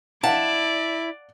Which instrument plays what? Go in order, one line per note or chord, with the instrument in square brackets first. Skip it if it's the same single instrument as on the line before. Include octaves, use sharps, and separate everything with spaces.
[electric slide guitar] E4 [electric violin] D5 [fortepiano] F5 F#5 [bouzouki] A5